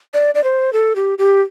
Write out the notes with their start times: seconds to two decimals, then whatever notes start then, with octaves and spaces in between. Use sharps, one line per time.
0.14 D5
0.35 D5
0.44 C5
0.73 A4
0.96 G4
1.18 G4